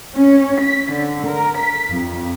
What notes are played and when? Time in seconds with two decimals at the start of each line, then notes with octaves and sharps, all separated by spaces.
0.16 C#4
0.61 B6
0.93 D3
1.27 A#4
1.58 B6
1.90 F2